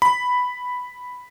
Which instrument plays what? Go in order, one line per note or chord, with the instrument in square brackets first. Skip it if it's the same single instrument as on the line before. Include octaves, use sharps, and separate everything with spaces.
[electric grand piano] B5